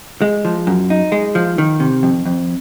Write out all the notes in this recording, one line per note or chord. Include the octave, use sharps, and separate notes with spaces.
G#3
F3
F#2
D#4
G#3
F3
D#3
C3
F2
F2